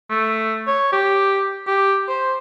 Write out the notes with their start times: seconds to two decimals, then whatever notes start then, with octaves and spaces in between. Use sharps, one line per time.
0.09 A3
0.67 C#5
0.92 G4
1.67 G4
2.08 C5